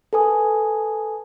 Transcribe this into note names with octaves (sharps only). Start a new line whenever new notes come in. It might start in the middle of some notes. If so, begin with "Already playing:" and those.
A4 B4 G#5 D#6